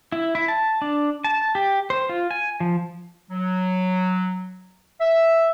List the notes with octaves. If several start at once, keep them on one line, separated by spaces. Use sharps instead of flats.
E4
E4
A5
D4
A5
G4
C5
F4
G#5
F3
F#3
E5